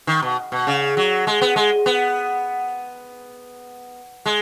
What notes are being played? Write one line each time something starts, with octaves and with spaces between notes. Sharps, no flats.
D#3
B2
B2
C#3
F#3
G#3
B3
G#3
B3
G#3